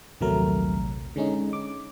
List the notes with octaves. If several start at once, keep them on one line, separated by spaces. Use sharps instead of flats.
A#1 D#2 C3 F#3 A3 A#4
D3 G#3 C#4 D#4
D6